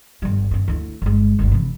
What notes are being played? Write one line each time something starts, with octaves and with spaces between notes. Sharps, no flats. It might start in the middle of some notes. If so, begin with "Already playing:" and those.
G1 G3
G2 C4
D2 E4
G1 G#3
G1 D2
C3 E3